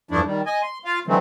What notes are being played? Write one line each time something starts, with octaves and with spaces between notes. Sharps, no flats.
E2 G2 F3 A3 D4 E4
D#3 G3
D#5 G#5
C6
F4 F5
D3 E3 F#3 G#3 A3 C4